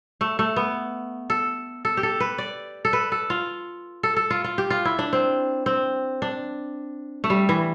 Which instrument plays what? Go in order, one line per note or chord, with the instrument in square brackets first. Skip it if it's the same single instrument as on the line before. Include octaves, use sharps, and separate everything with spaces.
[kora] A3
A3
B3
A4
A4
G4
A4
B4
D5
A4
B4
A4
F4
A4
A4
F4
F4
G4
F4
E4
D4
C4
C4
D4
A3
G3
E3